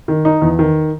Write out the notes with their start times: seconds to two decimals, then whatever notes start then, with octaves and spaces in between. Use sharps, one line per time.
0.08 D#3
0.25 D#4
0.42 E2
0.59 D#3